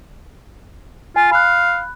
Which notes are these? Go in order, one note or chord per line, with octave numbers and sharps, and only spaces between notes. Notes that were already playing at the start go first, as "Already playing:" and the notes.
F4 G#5
F5 B5 F#6